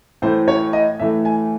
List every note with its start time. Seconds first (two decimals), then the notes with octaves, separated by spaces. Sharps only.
0.22 A2 E3 A3 C5
0.48 C#5
0.73 D#5
1.00 A2 E3 A3 E5
1.25 G#5